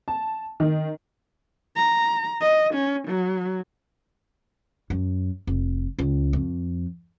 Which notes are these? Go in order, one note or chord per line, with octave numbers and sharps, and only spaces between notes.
A5
D#3
A#5
D#5
C#4
F#3
F#2
F1
C#2
F2